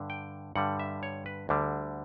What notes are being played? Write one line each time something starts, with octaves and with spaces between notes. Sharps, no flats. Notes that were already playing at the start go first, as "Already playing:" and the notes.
Already playing: G2 D3
G5
G2 D3 G3 F#5
E5
C#5
B4
D2 D3 G3